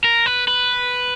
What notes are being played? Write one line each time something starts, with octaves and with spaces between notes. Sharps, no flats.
A#4
B4
B4